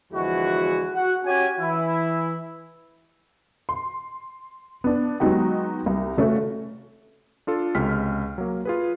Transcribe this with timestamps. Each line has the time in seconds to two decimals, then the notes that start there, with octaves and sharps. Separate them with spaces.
0.13 E2 D3 F3 G#3 E4 F#4
0.95 F#4 F#5
1.25 C#4 F#4 G4 G#5
1.60 E3 E4
3.69 C6
4.84 B3 D4
5.20 F#3 G#3 B3 D#4 F#4 G4
5.86 C2
6.17 C#3 A3 C#4 F#4
7.47 D4 F4 A4
7.75 C#2 C3 G#3 F6 B6
8.38 F#3 A#3
8.65 F4 G#4 B4